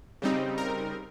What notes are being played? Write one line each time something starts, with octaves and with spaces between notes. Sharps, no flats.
C#3 G3 C4 D#4
A#4